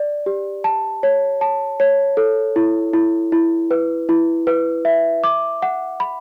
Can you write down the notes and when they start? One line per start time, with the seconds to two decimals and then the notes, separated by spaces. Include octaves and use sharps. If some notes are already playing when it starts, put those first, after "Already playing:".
Already playing: D5
0.26 G4
0.64 A5
1.03 C#5
1.41 A5
1.80 C#5
2.17 A4
2.56 E4
2.93 E4
3.32 E4
3.71 B4
4.09 E4
4.47 B4
4.85 E5
5.24 D6
5.62 F#5
6.00 B5